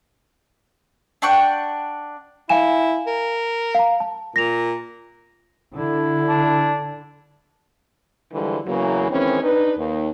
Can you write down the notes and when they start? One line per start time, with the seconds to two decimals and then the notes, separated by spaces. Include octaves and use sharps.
1.22 D4 F#5 G5 C#6
2.49 E4 F5 G#5 E7
3.07 A#4
3.75 F5 A#5
4.00 A5
4.36 A#2 A#6 F7
5.75 D3 E4
6.29 D4
8.32 D3 E3 F3 G3 G#3
8.66 E2 C#3 E3 F#3 A#3
9.10 D#3 E3 G#3 C4 C#4
9.42 D4 D#4 B4
9.77 D#2